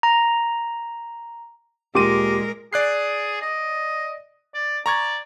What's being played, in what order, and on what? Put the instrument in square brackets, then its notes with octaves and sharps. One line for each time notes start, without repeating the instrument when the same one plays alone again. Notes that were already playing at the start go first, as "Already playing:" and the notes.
[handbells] A#5
[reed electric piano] D2 G4 D6 [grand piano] A#2 C6 D#7 [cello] G#3 A#4
[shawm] G#4 [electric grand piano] D5 F#6 C7
[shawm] D#5
D5
[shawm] D5 [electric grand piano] A#5 C#6 G#6